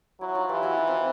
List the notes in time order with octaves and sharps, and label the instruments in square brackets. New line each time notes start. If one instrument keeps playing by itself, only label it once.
[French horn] F#3 [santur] E4
[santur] D#4 F4
[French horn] E3 [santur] F4 G4
[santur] E4 F#4
D#4 F4
C4
A#3